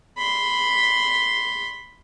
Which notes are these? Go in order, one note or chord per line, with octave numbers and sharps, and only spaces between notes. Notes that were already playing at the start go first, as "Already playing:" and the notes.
B5 C6